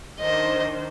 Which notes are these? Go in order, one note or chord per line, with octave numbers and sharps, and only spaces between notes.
D#3 D4 C5 D#5